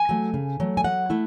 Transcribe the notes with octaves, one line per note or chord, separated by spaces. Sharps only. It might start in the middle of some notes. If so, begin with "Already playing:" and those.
Already playing: G#5
F#3 A3
C#3
F#3 A3
G#5
F#3 F#5
A3 E4